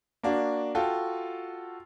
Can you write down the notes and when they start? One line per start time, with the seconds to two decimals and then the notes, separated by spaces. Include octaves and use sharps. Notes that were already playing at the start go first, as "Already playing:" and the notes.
0.23 A#3 D4 F#4
0.75 F4 F#4 A4 G5